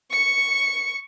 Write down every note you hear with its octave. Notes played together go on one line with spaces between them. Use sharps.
C#6 C#7